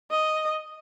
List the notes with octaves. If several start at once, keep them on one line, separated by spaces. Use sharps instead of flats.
D#5